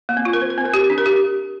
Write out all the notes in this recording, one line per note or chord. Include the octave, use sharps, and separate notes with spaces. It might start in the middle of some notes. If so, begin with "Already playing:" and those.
A#3
C4
F4
A#4
C5
A#4
C4
A#4
G4
D4
A#4
G4